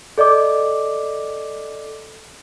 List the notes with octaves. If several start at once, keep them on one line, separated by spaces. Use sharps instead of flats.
A4 D5 D#5 D6